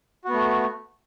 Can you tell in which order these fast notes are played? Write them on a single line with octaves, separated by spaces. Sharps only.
F#4 B3 A3